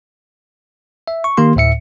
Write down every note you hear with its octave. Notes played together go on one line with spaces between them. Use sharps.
E5
C#6
D#3 A#3 G4 C6
D2 A2 E5 C#7